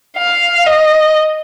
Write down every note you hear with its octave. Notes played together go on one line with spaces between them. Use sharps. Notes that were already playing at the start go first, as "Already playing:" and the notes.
F5
D#5